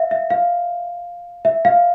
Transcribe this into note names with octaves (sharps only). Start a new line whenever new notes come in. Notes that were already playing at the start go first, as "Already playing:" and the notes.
Already playing: E5 F5
E5
F5
E5
F5